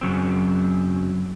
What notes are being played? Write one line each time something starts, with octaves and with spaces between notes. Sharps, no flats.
F#2 C#3 F#3 C4